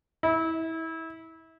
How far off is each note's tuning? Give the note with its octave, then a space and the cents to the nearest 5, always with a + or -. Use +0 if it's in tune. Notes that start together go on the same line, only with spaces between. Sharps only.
E4 -25